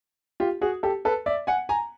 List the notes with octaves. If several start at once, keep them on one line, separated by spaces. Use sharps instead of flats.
F4 G4
F#4 G#4
G4 A4
A4 B4
D5 E5
F#5 G#5
G#5 A#5